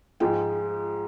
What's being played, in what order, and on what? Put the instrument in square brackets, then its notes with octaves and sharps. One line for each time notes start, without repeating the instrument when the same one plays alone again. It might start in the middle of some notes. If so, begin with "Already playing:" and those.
[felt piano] G#2 F3 G#3 G5